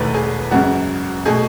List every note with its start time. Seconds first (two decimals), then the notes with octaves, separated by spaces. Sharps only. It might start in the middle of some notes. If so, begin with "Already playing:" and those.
Already playing: E1 E2 D#3 A3 B4
0.14 G#4
0.51 G#1 F#2 C#3 G#3 F#4
1.25 B2 A3 G#4